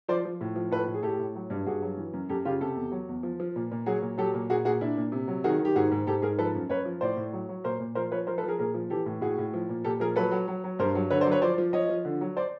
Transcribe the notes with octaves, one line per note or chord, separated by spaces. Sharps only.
F3 C5 D5
F3
A2
F3
A2 A4 B4
A2
G#4
A2 G4 A4
A2
F#3
G2
G2 F#4 G#4
F#3
E3
F#2
F#2 G4 A4
C#3 F4 G4
C3 G4 A4
E2
F#3
E2
F3
F3
A#2
A#2
F#3 F#4 G#4
A#2
F#3 G4 A4
A#2
A#2 F#4 G#4
A#2 F#4 G#4
A#2 D4 E4
A#2
C3
F#3
D#3 F#4 G#4
D#3
G4
G#2 F#4 G#4
G#2
G#2 G4 A4
G#2 G#4 A#4
F3 A4 B4
F#2
F#2 B4 C#5
F3
A2 C5 D5
A2
F#3
F#3
A#2 A#4 C5
A#2
F3 A#4 C5
F3 B4 C#5
F3 A#4 C5
A4 B4
F3 G#4 A#4
A#2 G#4 A#4
F3
E3 G4 A4
A2
A2 F#4 G#4
A2
F3
A#2
A#2 G4 A4
F3 G#4 A#4
F#3 A4 B4
F#3
F#3
F#3
G2 A#4 C5
F#3
D3 B4 C#5
C5 D5
F#3
B4 C#5
F3 C5 D5
F3
F3 C#5 D#5
F3
D3
F#3
C5 D5